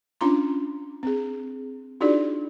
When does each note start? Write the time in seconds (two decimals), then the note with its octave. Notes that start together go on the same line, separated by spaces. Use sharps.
0.21 C#4 D4 F4 A#5 C6
1.03 C4 G#4
2.01 D4 D#4 F4 F#4 G#4 D5